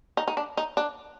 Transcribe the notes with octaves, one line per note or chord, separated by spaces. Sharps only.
D#4
D#4
D4
D#4
D4